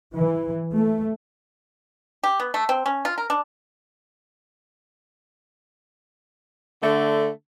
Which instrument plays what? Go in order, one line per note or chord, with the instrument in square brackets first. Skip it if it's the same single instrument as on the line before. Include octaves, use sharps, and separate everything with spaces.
[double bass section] E3
A3
[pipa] G4
B3
A3
C4
C#4
F4
A#4
D4
[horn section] D3 A3